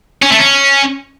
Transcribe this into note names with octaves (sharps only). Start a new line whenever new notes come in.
C#4
A3
C#4